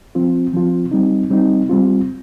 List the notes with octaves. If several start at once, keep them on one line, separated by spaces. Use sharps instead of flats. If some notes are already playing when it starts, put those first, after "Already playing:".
F3 C4 F4
F3 C4 F4
G3 C4 D#4
G3 C4 D#4
G3 C4 F4